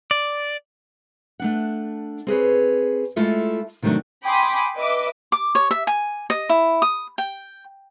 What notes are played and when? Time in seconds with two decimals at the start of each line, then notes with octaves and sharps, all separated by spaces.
0.11 D5
1.40 A3 D4 F#5
2.27 C4 G#4 B4 C#5
3.16 G#3 A3 E4 F4 A4 E5
3.82 C3 D#3 F#3 A3 D4
4.24 G5 G#5 B5 C6 D6 D#6
4.76 B4 D#5 E5 D6
5.32 D6
5.55 C#5
5.71 E5
5.87 G#5
6.30 D#5
6.49 E4
6.82 D#6
7.18 G5